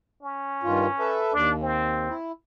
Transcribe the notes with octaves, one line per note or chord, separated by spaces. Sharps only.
C#4
G2 D#3 F4
A4 B4 E5
D#2 D4
C4
E4